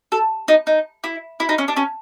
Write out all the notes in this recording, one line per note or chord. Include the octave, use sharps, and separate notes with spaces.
A4
D#4
D#4
E4
E4
D#4
C#4
D4
C#4